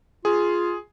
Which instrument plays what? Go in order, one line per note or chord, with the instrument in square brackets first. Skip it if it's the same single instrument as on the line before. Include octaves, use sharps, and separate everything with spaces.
[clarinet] F4 [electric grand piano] G#4